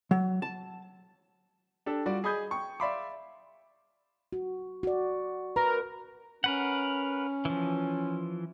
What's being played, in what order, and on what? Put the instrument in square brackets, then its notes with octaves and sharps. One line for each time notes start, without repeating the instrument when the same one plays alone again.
[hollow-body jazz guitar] F#3
A5
[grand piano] D4 G4 A4
G3 F4 F#4 D5
G#4 D#5 B5 D#6 G6 G#6
G5 C#6
D5 E5 F5 B5 C6 D6
[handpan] F#4
F#4 D5
[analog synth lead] A#4 [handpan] B4
[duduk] C#4 [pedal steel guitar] A#4 B4 F#5
[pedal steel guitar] E3 F3